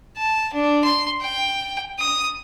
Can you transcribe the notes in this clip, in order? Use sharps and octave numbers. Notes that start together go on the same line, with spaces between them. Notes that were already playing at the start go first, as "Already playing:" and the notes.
A5
D4
C6
G5
D#6